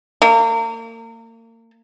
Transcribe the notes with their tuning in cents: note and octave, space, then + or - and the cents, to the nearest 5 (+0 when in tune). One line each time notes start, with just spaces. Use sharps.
A#3 -35